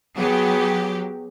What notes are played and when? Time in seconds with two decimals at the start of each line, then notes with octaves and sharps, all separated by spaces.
0.17 F#3 B3 G4 G#4